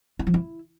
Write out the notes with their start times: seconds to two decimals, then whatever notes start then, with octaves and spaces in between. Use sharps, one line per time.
0.19 E4
0.27 F3
0.34 E4